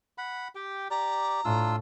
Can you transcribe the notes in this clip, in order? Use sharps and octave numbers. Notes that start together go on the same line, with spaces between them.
F#5 B5
G4 G5
G4 D5 A#5
A2 D4 F4 E6